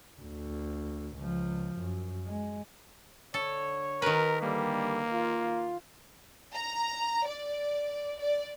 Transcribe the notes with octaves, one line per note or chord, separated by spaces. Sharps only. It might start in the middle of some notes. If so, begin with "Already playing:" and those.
D2
C#2 F3
F#2
G#3
D3 A4 C#5
D#3 A#4 B4
D3 G3 A#3
F4
A#5
D5
D5